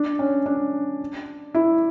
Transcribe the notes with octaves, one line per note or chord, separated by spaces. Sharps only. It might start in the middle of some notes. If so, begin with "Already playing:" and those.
Already playing: D4
C#4
D4
E4